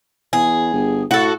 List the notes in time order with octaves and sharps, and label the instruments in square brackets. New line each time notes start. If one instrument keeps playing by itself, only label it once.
[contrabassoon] E2 [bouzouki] G#4
[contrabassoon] G1
[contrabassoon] A2 [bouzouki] F#4 A4